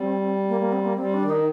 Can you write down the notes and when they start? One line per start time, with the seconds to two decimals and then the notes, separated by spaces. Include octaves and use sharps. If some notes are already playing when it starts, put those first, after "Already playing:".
Already playing: G3 C4
0.48 A#3
0.60 A#3
0.72 C4
0.84 A#3
0.96 G3 C4
1.14 D4
1.22 D#3
1.29 D#4